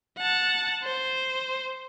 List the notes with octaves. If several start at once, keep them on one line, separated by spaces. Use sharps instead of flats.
F#5 A5
C5